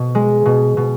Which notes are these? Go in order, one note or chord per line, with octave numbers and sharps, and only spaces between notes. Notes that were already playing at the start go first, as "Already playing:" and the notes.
Already playing: B2
G#3
B2
B2